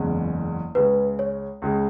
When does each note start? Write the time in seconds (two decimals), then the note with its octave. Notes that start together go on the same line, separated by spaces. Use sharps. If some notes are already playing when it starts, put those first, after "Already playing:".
Already playing: F#1 E2 C#3 G#3
0.75 C#2 C#3 G#3 B4
1.19 C#5
1.62 C#2 C#3 G#3